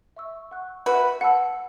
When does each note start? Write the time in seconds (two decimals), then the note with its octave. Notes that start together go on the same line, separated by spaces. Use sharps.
0.17 E5 C#6 E6
0.51 F#5 C#6 F#6
0.86 F#4 B4 E5 B5 E6
1.21 F#5 A5 E6